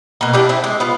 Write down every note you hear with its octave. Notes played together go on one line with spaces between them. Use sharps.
B2 A#3
D4 E4 G4 D5
A3 C4 E4
G#3 D4
B3 F4